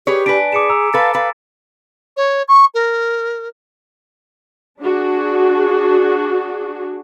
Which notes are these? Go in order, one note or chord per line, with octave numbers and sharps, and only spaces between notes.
G4 G#4 B4 C#5
D4 B4 G#5 B6 D7
G#4 D6 C#7 E7
A#5 E6
A4 B4 F5 A6
B4 F5
C#5
C#6
A#4
D4 F#4 G#4